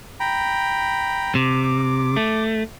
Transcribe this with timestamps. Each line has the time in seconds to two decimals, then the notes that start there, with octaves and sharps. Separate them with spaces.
0.20 G5 A#5 B5
1.35 C3 D6
2.17 A3